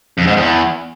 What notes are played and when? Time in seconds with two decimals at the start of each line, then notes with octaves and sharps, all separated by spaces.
0.18 F2
0.27 G#2
0.36 E2